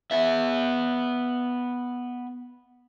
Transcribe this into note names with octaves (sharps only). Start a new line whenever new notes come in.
B3 E5